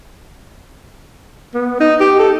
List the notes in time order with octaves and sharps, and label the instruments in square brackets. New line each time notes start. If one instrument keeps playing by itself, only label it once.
[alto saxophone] B3
D#4
G4
A4